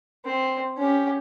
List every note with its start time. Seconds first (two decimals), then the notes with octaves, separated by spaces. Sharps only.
0.25 C4
0.78 C#4 G4